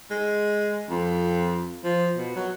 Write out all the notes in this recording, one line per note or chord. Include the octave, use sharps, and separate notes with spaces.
G#3
F2
F3
B2
F#3